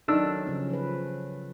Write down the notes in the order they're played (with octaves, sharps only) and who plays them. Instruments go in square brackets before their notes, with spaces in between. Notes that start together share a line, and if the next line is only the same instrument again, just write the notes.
[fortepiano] D#3 D4 E6 [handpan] F#3 A4
[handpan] C#3 F3 C#4
F3 B4